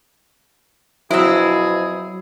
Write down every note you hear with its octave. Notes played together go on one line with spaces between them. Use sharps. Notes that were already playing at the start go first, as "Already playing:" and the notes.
B2 F3 F#3 C4 E4 G#4 E6